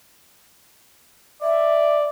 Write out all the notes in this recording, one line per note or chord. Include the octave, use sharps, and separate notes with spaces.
D5 E5